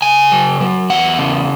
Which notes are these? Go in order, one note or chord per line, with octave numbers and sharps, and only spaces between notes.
C#3 G#5
F#3
F#3
E2 F#5
C#3